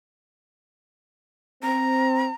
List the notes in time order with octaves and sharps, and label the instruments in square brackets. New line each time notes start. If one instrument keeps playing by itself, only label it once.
[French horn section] C4 [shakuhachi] A#5